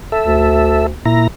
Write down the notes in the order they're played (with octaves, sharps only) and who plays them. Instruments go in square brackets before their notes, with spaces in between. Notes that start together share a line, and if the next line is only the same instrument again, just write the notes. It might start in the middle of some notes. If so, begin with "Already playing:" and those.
[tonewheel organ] A4 E5
[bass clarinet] D2
[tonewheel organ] A#2 E4 A#5